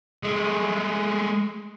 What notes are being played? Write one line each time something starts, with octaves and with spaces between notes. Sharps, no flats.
G#3 A3